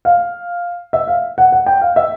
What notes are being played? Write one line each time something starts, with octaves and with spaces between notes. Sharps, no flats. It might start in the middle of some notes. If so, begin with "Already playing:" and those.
F5
E5
F5
F#5
F#5
G5
F5
E5